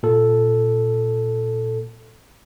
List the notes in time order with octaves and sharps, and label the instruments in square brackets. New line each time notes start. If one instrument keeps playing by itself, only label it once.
[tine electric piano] A#2 A4